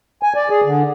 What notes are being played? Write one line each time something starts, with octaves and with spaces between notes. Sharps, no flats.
G#5
D5
G#4
D3